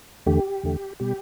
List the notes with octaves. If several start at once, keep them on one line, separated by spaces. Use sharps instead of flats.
E2 D3 A3 G4
E2 D3 A3
B2 G3 G4